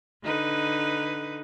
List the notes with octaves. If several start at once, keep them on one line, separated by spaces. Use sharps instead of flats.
D3 D#4 B4